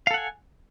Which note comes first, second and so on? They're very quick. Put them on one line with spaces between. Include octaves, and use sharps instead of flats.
F5 A4 F#5 G#5